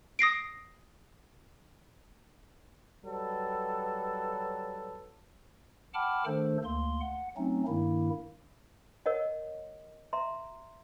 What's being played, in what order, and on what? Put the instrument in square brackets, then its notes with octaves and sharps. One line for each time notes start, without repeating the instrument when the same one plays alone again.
[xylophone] D#6 A#6 C7 D7
[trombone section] F#3 G3 A4 B4
[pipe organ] F#5 G5 A5 B5 D6 F6
D#3 A3 D4 A4 C5
D2 A#3 C6
F#5
F#3 A3 C4 C#4 D#4
G2 D#3 A#3 E4
[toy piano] A#4 C#5 D#5 F#5
E5 A#5 C6